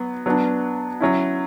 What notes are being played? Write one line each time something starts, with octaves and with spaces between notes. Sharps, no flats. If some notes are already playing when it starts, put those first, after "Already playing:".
Already playing: F#3 B3
F#3 B3 D4
F#3 C#4 E4